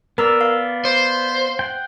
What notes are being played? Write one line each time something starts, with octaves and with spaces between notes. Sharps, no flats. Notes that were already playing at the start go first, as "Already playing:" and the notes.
B3 A#4 D5 A#5 E6
F5
C5
F#5 G5